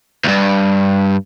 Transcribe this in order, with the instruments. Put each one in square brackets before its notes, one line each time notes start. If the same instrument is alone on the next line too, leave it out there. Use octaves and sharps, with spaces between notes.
[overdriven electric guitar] D2 G2